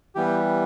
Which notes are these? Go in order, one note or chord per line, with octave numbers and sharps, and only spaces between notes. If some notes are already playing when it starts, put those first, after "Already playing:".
E3 G3 B3 G4